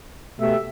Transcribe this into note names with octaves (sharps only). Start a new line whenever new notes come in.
B2 A3 G4 E5